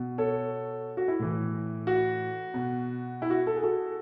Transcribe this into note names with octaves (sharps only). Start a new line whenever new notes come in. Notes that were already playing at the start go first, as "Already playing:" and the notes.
Already playing: B2
A4 C#5
F#4
E4
A2 E3
F#4
B2
E4
F#4
A4
G#4
F#4 A4